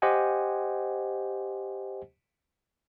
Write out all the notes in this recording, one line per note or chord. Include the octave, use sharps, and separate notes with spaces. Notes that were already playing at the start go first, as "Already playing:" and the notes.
G4 C5 D#5 F#5 G#5